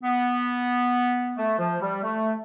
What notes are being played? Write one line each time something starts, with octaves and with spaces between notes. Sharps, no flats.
B3
A3
F3
G3
A3